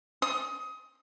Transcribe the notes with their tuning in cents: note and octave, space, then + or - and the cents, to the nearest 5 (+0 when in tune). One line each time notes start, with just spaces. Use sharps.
D#6 +25